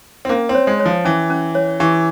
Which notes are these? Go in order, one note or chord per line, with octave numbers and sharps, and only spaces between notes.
C4
A#3 C#4
C4
C#5
G#3
C#5
F3
E3 C#4
C#4
C#5
E3 G4